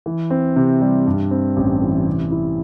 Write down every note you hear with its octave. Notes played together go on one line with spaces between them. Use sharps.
E3
C4
C3
G3
G2
C4
A1
E3
C3
E4